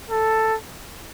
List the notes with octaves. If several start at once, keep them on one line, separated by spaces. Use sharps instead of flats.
A4